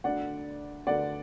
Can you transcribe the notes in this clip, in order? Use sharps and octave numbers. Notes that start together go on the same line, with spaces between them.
D2 D3 D5 F#5
D2 D3 D5 F#5